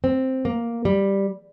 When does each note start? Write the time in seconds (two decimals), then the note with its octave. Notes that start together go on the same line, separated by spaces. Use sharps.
0.04 C4
0.45 A#3
0.85 G3